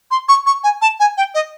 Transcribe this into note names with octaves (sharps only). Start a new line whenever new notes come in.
C6
C#6
C#6
G#5
A5
G#5
G5
D#5